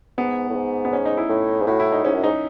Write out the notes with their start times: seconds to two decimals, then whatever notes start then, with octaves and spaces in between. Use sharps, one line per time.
0.18 G#2 B3
0.50 A2
0.55 G#2
0.85 B3
0.93 C#4
1.05 D#4
1.17 E4
1.29 A2
1.62 G#2
1.67 A2 F#4
1.80 E4
1.92 D#4
2.05 G#2 C#4
2.14 F#2
2.23 G#2 D#4